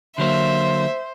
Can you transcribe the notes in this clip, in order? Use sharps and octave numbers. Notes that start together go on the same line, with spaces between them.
D3 F#3 A#3 C5 E5